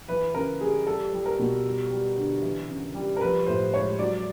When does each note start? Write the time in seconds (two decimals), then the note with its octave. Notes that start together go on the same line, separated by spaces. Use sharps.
0.08 E3 B4
0.34 C#3 A#4
0.61 G3 G#4
0.86 G3 A4
1.13 G3
1.26 A#4
1.39 B2
1.65 G3
1.91 G3
2.17 D3
2.42 E3
2.69 C#3
2.94 G3
3.17 A#4
3.21 F3 B4
3.46 A2 C5
3.74 G#3 C#5
3.99 F#3 D5